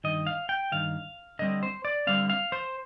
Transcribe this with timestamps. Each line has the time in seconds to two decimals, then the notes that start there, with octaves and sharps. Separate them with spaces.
0.04 G2 D#3 D#5
0.27 F5
0.49 G5
0.72 G2 D#3 F5
1.39 D3 G3 C4 D#5
1.63 C5
1.85 D5
2.07 D3 G3 C4 F5
2.30 F5
2.52 C5